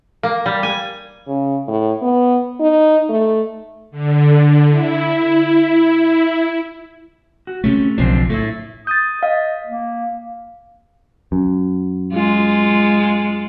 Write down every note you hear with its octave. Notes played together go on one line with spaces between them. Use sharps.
A#3
G3
G#5
C#3
A2
B3
D#4
A3
D3
E4
F#4
C3 A3 C#4
F#1 B1 F3 C4 D4
A2 A3 E4
D#6 G6 A6
D#5 F5
A#3
F#2
G#3 F4